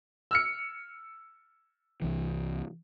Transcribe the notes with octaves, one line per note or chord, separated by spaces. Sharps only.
E6 F6 C#7
C2 E3